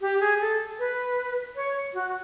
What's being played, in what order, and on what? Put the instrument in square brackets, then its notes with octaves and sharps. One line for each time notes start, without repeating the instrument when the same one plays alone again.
[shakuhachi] G4
G#4
A4
B4
C#5
F#4